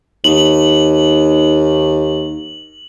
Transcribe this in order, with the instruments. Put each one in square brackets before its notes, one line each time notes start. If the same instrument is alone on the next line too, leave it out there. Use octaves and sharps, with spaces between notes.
[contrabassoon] D#2 [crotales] F#7